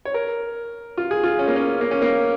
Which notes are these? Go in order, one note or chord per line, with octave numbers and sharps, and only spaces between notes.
C#5
A#4
F4
G#4
F4
C#4
A#3
C#4
A#3
C#4
A#3